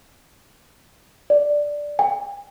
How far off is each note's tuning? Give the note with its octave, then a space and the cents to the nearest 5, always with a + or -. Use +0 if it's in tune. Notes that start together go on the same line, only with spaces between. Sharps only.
D5 +0
G5 +45